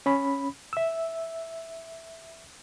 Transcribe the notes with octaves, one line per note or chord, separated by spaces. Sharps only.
C#4 B5
E5 E6